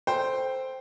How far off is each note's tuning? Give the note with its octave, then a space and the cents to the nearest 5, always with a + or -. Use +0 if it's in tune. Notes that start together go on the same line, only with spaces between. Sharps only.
A4 +0 C5 +0 G5 +0